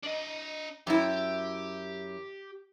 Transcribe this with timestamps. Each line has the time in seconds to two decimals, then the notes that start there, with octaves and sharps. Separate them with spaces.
0.03 D4 D#5
0.87 F#2 E4 G4